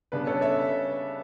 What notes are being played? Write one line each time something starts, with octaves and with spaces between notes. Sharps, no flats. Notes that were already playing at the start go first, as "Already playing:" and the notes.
C#3 G3 B3 D4 B4
A4 C#5
C#5 E5